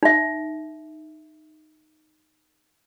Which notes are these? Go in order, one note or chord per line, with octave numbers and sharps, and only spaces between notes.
D#4 E5